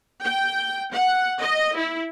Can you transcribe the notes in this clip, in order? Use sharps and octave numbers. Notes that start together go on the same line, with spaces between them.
G5
F#5
D#5
E4